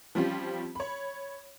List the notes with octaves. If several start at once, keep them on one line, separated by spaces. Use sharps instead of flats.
F3 G3 C4 C#4 F4 G4
C#5 B5